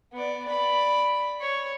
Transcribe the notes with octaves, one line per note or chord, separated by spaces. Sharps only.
B3 D5
D5 B5
C#5